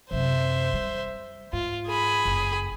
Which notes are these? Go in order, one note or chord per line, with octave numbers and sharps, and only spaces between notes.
F#2 C3 C5 E5
G3
G#2 F4
G#4 B5
F#1